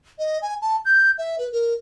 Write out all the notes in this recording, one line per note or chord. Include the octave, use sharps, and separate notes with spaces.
D#5
G#5
A5
G6
E5
B4
A#4